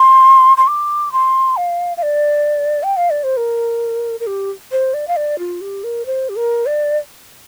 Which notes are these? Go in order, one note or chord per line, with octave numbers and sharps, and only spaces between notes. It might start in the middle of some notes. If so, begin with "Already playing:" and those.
Already playing: C6
C6
D6
C6
F5
F5
D5
G5
F5
D5
C5
A#4
A#4
G4
C5
D5
F5
D5
F4
G4
A#4
C5
G4
A#4
D5